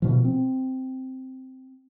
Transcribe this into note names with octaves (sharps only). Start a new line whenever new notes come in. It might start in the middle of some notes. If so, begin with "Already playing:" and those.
B2 F3
C4